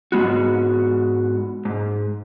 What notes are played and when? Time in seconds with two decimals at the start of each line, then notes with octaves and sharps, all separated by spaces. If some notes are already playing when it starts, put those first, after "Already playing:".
0.12 G#2 G#3 B3 F#4
1.65 G#2